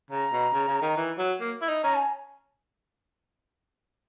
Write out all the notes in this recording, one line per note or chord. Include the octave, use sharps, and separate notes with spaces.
C#3 A#5
B2
C#3
C#3
D#3
E3
F#3
A#3
E4
D#4
C#4 A#5
G#5